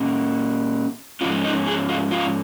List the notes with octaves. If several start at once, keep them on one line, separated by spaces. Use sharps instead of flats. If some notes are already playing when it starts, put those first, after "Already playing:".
Already playing: A#2 A#3 C#4
G#2 F3 C#4 F4
D#4
G#4
F4
F4